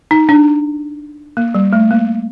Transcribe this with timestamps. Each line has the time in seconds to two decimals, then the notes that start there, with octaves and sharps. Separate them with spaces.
0.11 D#4
0.29 D4
1.37 A#3
1.55 G3
1.73 A3
1.91 A#3